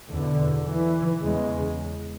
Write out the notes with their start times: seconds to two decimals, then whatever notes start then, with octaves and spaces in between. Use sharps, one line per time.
0.11 E2 B2 D3
0.67 E3
1.22 E2 C#3 G#3